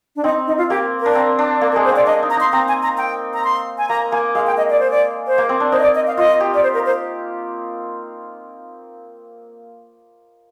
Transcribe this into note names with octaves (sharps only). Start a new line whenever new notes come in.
D4
C4 D#4
D#4
F4
A#3 G4
A#4
D4
C4
D4
A#3 A#4
A#4
G#3
C5
C4 D5
D4 D#5
D#4
A#5
D#4 C6
C4 A#5
G#5
A#5
G5
A#5
C6
G#5
A#3 A#5
A#3 G#5
G#3 F5
G5
D#5
D5
C5
D5
C5
A#3
C4
D4
D#4 C5
D#5
D5
D#5
F5
F4 D#5
G4
D5
C5
A#4
C5